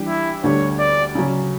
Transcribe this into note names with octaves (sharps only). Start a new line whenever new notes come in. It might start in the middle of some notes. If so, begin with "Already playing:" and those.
Already playing: E3 G3 D4 G4
E4
D2 D3 G3 D4 C#5
D5
C#3 F#3 C#4